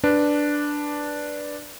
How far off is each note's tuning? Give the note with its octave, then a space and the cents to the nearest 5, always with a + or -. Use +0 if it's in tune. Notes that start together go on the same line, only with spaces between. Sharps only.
D4 +0 B4 +0